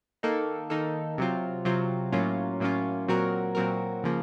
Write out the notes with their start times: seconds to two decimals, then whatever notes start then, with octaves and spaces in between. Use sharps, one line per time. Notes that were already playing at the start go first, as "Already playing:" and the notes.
0.23 D#3 A#3 D#4 A4
0.70 D#3 A#3 D#4 A4
1.18 C3 F#3 C4 F4
1.65 C3 F#3 C4 F4
2.12 A2 F#3 A#3 C#4 F4
2.60 A2 F#3 A#3 C#4 F4
3.08 A#2 F#3 C4 F#4 A#4
3.55 A#2 F#3 C4 F#4 A#4
4.04 C#3 F3 A#3